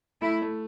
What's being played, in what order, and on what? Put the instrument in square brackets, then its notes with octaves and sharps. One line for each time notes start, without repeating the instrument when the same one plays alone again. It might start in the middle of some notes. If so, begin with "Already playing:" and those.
[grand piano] A3 [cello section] E4
[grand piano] A3